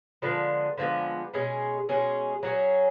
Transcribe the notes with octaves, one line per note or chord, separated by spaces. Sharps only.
D3 F3 G#3 B3
D3 F3 G#3 B3
B2 G#3 C#4 G#4
B2 G#3 C#4 G#4
F#3 C#4 G#4